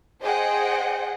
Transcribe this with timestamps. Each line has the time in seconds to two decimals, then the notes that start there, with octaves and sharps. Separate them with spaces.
0.22 G#4 C5 D#5 F#5 G5